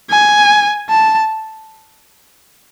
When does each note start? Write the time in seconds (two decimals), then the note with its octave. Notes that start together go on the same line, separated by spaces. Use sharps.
0.10 G#5
0.90 A5